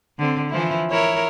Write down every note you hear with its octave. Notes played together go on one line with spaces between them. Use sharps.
D3 C4
E3 F3 E4
E4 A#4 C#5